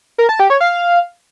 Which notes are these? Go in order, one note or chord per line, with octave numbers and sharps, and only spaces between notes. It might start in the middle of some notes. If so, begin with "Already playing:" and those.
A#4
A5
G4
C#5
F5